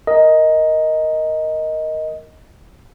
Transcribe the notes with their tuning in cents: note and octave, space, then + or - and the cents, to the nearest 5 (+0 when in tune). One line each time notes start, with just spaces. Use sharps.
A#4 +0 D#5 +10